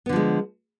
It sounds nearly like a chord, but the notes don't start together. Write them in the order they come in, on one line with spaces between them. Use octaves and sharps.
B3 D3 F3 G#3